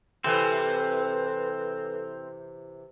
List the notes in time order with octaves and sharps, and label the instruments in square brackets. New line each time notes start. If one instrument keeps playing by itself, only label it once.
[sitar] C3 E3 [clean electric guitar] C4 [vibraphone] A4 [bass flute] B4